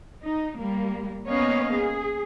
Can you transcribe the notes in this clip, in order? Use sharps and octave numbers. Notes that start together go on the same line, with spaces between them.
D#4
G3 A#3
A#3 B3 C#4 C#5 D#5 F5
G#4